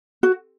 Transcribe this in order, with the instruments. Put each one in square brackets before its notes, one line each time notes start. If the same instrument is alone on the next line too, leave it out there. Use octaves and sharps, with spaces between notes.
[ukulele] F#4